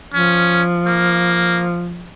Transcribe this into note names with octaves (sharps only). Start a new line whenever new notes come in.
F3 C#4
A#3